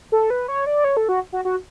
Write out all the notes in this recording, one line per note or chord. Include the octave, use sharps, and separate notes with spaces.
A4
B4
C#5
D5
C#5
A4
F#4
F#4
F#4